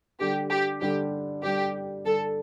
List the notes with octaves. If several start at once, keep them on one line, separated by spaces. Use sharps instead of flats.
D3 G3 D4 G4
G4
D3 G3 D4 G4
D3 G3 D4 G4
D3 G3 D4 A4